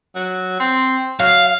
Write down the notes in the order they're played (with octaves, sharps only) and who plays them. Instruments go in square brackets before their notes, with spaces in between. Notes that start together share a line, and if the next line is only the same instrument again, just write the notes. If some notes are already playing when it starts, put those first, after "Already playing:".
[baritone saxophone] F#3
C4
[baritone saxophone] F#3 [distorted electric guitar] F5